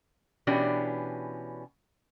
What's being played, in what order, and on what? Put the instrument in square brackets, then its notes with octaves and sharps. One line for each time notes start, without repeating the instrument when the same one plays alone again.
[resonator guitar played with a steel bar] B2 E3 C#4 D4 G4